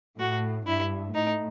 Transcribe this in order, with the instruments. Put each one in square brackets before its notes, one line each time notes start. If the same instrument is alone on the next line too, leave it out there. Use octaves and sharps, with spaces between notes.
[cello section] A2 [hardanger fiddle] F#4
[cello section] G2 [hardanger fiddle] E4
[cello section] A2 [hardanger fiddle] D#4